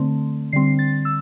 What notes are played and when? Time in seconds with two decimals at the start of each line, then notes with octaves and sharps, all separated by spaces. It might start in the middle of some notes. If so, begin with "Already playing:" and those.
Already playing: D3 A3 C4
0.53 D3 G3 C4 C7
0.79 A6
1.05 E6